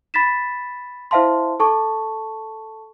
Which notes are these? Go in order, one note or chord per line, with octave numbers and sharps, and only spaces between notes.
B5 A6 B6 E7
E4 C5 E5 F5 A5 C6
A4 A5 C#6